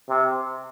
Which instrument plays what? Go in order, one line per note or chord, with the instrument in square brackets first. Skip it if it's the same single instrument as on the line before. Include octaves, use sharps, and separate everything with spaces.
[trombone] C3